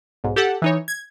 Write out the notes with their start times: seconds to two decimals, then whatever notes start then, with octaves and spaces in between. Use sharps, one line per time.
0.24 B1 G#2
0.36 G4 A4 F#5
0.62 E3 D#4 C#5
0.88 G#6